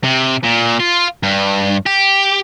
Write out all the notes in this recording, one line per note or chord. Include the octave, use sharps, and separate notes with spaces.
C3
A#2
F4
G2
G4